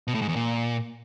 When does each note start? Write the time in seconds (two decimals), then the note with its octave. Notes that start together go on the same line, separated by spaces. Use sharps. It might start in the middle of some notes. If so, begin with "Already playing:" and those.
0.08 B2
0.15 A2
0.22 G#2
0.29 E2
0.36 A#2